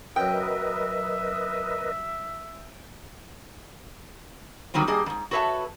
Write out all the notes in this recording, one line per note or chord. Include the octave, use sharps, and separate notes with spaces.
F#2 F#3 A#4 B4 D#5 E5 G5
D3 D#3 F#3 G3 C4
G2 A#3 G4 G#4 D#5
F2 G#2
F#4 A4 B4 C#5 E5 A5